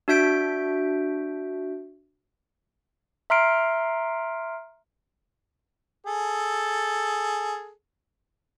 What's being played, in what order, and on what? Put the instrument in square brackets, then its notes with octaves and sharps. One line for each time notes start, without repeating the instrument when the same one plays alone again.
[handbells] D4 F#4 E5 G6 B6 D7
E5 A#5 C6 F6 C7 D7
[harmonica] G#4 A4